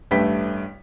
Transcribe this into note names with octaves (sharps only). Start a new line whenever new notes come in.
A1 G2 A3 B4 G5 B6